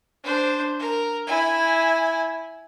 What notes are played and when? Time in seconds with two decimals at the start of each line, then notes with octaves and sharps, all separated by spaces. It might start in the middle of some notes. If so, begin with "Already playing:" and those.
0.24 D4 C5
0.79 A#4
1.27 E4 G#5